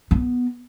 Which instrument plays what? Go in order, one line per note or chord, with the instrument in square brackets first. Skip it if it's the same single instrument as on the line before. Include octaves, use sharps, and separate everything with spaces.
[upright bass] B3